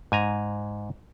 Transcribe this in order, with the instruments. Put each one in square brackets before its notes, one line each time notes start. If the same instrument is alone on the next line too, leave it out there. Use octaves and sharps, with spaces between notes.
[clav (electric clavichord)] G#2 G#5 A#5